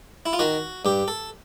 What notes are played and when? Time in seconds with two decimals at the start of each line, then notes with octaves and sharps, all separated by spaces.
0.26 E4
0.33 F4
0.39 D#3 F#4
0.85 G2 G4
1.08 A4